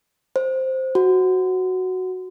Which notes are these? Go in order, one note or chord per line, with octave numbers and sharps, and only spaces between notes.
C5
F#4